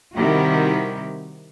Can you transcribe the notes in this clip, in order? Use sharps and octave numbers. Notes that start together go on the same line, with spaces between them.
C3 D#3 G3 E4 F#4 G4